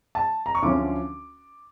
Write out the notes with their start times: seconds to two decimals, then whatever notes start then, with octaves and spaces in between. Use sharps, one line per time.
0.15 A5
0.46 A#5
0.55 C#6
0.62 D2 D3 F3 C#4 D6